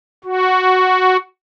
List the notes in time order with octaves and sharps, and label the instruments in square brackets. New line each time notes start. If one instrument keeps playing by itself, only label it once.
[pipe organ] F#4